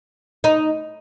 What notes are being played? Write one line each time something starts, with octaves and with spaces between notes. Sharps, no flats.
D#4